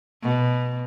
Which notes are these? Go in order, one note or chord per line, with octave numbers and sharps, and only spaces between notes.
B2